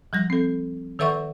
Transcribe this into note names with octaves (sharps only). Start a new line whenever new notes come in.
F3 G3 A#6
C4 A4
D#3 A4 B4 E5 F#5 C#6